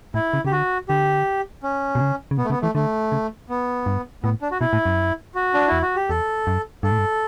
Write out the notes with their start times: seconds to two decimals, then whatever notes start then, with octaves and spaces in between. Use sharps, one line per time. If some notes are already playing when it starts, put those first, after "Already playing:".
0.14 A2 E4
0.33 C#3
0.45 C#3 G4
0.51 D3 F#4
0.89 D3 G4
1.63 C#4
1.95 B2
2.01 C#3
2.31 C#3
2.38 B2 B3
2.45 A3
2.50 C#3 B3
2.62 E3 A3
2.75 D3 A3
3.12 C#3
3.49 B3
3.86 G2
4.23 A2 B3
4.42 D4
4.51 F#4
4.61 B2 E4
4.73 A2
4.86 F#2
5.35 F#4
5.54 D4
5.68 E2 E4
5.82 F#4
5.96 G4
6.09 E2 A4
6.47 F#2
6.83 G2 A4
6.92 A2
6.98 G2